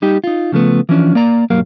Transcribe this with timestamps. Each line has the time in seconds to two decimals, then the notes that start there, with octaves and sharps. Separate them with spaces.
0.02 G3 D#4 G4
0.24 D#4 F4
0.52 C#3 F3 A3 B3
0.89 E3 F3 C#4 D4
1.15 A#3 D5 A#5
1.50 B1 G2 F#3 A#3 A#4 F5